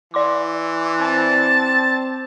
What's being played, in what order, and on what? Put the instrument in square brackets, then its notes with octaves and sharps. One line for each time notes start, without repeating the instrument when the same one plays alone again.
[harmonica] E3 [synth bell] D5 C6 D6
[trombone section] C4 [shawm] A5